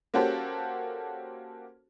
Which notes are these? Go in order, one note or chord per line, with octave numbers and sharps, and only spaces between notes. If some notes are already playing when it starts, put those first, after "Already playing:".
A#3 C#4 F#4 G4 A4 C5